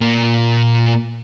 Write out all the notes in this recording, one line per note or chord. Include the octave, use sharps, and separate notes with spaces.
A#2 A#3